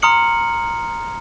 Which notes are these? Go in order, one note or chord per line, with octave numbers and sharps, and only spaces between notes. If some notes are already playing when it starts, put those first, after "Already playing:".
A#5 C6 D#6 F6 C#7 F#7